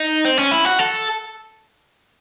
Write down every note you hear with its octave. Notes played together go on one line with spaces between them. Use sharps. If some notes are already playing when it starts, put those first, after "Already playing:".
Already playing: D#4
C4
C#4
E4
F#4
A4